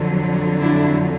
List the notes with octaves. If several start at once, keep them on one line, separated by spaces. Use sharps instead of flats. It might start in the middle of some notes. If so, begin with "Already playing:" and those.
Already playing: F2 D3 F#3
D4 E4